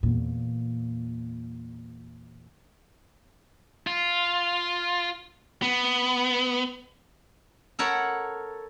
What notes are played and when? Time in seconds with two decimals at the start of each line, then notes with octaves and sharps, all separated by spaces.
0.03 E2 A#2
3.87 F4
5.62 B3
7.79 A4 A#4 C#5 F#5 B5